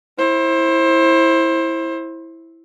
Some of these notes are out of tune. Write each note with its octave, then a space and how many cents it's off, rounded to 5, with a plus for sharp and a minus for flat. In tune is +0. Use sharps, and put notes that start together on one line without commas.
E4 -5 C5 +25